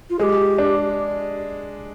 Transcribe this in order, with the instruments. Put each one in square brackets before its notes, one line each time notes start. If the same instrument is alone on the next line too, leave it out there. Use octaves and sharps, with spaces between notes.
[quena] F4
[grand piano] G#3 [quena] G4 A4
[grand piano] D4